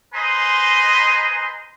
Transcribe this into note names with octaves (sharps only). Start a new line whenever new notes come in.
B4 C5 D#5 G#5 A#5 C6